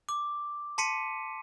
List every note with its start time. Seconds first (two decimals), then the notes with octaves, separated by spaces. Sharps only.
0.09 D6
0.78 A5 C6 B6 C#7 D#7